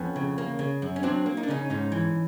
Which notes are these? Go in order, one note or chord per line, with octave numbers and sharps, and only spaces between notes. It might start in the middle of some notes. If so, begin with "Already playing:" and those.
Already playing: F2 B3 C#4
C#3
A#3
C#3
F#2
C#4
F#3 C4 D4
A#3
D#4
D4
C#3 C#4 D#4
G#2 C#4 D#4
E3